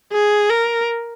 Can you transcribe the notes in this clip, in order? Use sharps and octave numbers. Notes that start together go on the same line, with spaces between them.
G#4
A#4